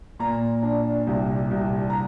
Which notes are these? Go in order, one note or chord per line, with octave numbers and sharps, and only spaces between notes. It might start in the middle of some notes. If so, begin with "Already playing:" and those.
A#2 A#5
D4
C2
C2
A#5